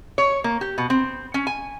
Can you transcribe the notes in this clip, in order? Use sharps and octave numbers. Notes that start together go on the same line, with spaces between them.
C#5
A#3
G4
B2
C4
C#4
G#5